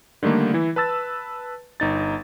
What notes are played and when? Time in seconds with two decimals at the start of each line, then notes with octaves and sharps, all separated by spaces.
0.23 D3 D#3 G3 A3 A#3
0.54 E3 E4
0.76 B4 A5 E6 A6
1.80 G1 D#4 A6